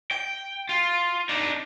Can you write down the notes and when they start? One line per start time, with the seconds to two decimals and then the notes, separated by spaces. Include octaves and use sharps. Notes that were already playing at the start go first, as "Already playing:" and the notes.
0.11 G5
0.69 F4
1.29 D4 D#4